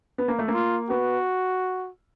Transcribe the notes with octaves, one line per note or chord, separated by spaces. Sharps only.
B3
A#3
A3
A#3
F4
B3 F#4